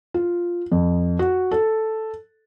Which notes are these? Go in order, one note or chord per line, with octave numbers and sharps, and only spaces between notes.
F4
F2
F#4
A4